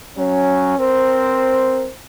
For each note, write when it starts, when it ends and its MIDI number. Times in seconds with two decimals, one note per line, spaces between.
0.17 0.78 54
0.17 0.78 61
0.78 1.88 60
0.78 1.88 70
0.78 1.88 72